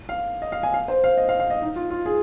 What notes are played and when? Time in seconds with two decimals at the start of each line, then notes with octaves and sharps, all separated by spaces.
0.09 F5
0.42 D#5
0.52 F5
0.63 G#5
0.74 F5
0.88 C5
1.04 F5
1.17 D#5
1.29 F5
1.40 F5
1.50 D#5
1.62 D#4
1.76 F4
1.90 F4
2.05 G#4